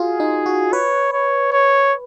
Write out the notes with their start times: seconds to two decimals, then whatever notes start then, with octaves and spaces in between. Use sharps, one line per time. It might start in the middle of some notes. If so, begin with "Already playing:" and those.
Already playing: F4 F#4 G#4
0.20 D#4
0.46 F#4
0.73 B4 C#5
1.13 C#5
1.52 C#5